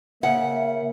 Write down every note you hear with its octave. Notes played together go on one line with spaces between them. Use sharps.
C#3 A#3 E5 F#5